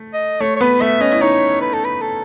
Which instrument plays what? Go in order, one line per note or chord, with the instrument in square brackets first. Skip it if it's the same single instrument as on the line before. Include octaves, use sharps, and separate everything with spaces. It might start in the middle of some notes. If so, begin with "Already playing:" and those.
Already playing: [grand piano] A3
[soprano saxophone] D#5
[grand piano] A3 [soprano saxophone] C#5
[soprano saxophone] C#5
[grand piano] B3 [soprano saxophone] B4
[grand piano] A3 [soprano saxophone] E5
[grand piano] C#4 [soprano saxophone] D#5
[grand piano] E4
[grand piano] D#4 [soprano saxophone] C#5
[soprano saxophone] B4
A4
B4
A4